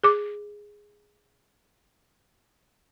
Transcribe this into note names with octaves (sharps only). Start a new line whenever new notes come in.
G#4 D6